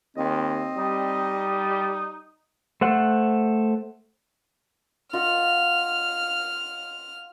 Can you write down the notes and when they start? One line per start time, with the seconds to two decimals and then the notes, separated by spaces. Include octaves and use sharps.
0.17 D#2 C4 D#5
0.77 G3 D#4
2.81 A3 C5 F#5
5.13 F4 D#5 F#5 F6